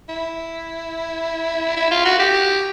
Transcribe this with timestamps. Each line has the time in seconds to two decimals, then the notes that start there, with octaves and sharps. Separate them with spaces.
0.09 E4
1.77 E4
1.91 F4
2.05 F#4
2.19 G4